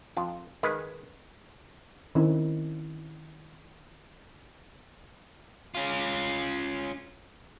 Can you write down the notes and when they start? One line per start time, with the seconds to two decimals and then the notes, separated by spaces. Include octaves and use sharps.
0.17 F2 F4
0.63 D#3 G#3 B4
2.15 D#3 C4 C#4 E4
5.75 C#4 F4